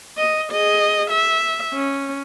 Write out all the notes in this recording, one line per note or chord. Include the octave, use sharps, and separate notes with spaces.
D#5
G#4 D#5
E5
C#4